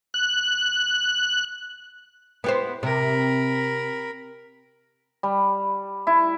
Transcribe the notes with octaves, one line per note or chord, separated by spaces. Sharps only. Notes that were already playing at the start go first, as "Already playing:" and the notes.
F#6
B3 E4 G4 C5
C3 A#4 B5
G3
E4